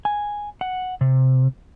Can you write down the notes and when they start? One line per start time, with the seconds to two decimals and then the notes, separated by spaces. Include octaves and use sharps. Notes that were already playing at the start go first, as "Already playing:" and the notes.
0.05 G#5
0.61 F#5
1.01 C3